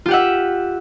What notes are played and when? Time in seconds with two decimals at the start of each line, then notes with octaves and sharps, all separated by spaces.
0.06 F4
0.08 G4
0.11 F#5
0.13 E5